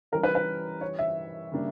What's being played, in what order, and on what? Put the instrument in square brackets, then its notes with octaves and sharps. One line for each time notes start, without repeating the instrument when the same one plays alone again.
[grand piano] E3 G3 C#4 [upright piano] A#4
[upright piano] B4
B4
C#5
E5
[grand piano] C#3 G3 A#3 D4